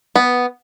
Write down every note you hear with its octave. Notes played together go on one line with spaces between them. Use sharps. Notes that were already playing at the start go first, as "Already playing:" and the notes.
B3